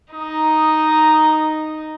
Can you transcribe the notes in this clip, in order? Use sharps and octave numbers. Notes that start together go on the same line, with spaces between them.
D#4 A#5 D#6